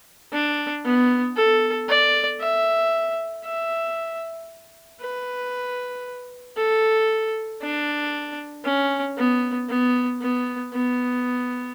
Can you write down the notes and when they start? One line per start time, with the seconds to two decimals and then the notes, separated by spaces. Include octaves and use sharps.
0.33 D4
0.84 B3
1.37 A4
1.89 D5
2.40 E5
3.45 E5
5.01 B4
6.57 A4
7.62 D4
8.65 C#4
9.17 B3
9.69 B3
10.21 B3
10.73 B3